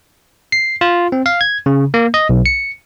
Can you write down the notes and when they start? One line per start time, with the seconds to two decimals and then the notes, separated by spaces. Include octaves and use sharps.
0.52 C7
0.81 F4
1.12 C4
1.26 F5
1.41 G#6
1.66 C#3
1.94 A#3
2.14 D#5
2.29 B1
2.46 C#7